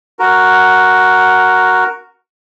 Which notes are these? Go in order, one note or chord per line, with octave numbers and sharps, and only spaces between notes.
F#4 A#4